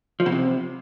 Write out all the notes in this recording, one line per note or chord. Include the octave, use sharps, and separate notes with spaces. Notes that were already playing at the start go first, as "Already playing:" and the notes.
F3
B2
C3